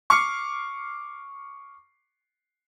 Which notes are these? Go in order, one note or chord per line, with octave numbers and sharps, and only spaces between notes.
C#6 D6 F6 C7 C#7